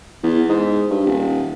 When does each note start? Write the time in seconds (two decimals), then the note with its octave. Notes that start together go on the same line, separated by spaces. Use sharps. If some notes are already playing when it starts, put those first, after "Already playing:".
0.23 E2
0.49 G#2
0.91 G2
1.06 D#1